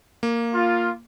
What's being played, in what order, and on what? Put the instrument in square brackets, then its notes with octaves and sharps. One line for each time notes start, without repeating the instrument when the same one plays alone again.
[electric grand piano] A#3
[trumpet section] F4